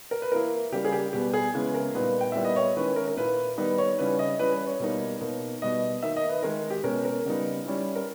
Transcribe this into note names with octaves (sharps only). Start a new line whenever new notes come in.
A#4
B4
E3 A#3 E4 A#4
C#3 G3 A#3 G4
G#4
G4
B2 G3 B3 G4
G#4
C#3 E3 G#3 B3
A#4
A#2 G3 B3 D#4 B4
G5
A#2 G3 B3 E4 E5
D#5
C#5
D#3 G#3 C#4 E4 B4
A#4
A#4
A#2 A#3 E4 B4
D#3 G3 B3 D#4 B4
C#5
C#3 G3 C#4 E4 B4
D#5
E3 G3 C#4 B4
B4
C#5
B2 G3 A#3 D#4
B2 A#3 D#4
B2 G3 B3 D#5
D#3 A#3 D#4 E5
D#5
B4
D#3 G#3 D#4 A#4
G4
B2 G#3 C#4 A#4
A#4
C#3 G3 B3 D#4
G3 C#4 E4
A#4